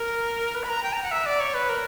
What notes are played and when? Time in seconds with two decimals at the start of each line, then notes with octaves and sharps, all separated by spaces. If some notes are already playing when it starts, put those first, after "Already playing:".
Already playing: A#4
0.55 B4
0.64 B5
0.69 A#5
0.83 G5
0.93 A#5
1.03 F#5
1.11 E5
1.26 D5
1.40 C#5
1.54 B4
1.69 A#4